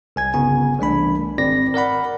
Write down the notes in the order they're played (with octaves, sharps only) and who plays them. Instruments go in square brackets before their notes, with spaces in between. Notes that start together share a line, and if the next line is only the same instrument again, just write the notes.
[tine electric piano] C2 G#5 G#6
G1 C#3 B3 G#5
C2 E3 A3 D4 B5
G#1 C4 D5 A#6
A#4 D5 F#5 B5